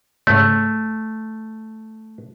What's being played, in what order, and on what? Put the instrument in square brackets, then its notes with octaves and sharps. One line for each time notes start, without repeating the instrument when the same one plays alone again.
[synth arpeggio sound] G#2 C#3 [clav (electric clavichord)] A3